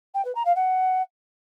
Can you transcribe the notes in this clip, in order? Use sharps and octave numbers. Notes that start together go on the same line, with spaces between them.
G5
B4
A#5
F5
F#5